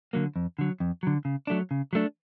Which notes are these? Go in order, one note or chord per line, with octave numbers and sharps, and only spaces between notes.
D3 F#3 A#3
F2
D3 F#3
F2
D3 F#3
C#3
F#3 A3 D4
C#3
F#3 A3 D4